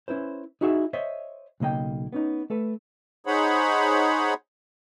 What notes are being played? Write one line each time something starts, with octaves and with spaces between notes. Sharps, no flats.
C#4 E4 B4 C5
D#4 E4 F#4 G#4 D5 E5
C5 C#5 D#5 E5
B1 C#3 A#3 D#5 G5
B3 C#4 D#4
A3 A4 B4
D#4 G#4 C5 C#5 F#5 B5